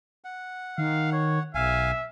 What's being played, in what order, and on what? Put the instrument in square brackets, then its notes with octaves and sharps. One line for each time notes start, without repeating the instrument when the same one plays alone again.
[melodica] F#5
[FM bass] D#3 [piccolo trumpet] F5
[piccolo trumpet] C#5
[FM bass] B1 [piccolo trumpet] E5 [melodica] F5 G#5